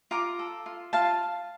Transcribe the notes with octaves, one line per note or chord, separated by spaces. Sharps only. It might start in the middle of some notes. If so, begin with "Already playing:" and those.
F4 A#5 D6
A4
F4
F4 F5 A5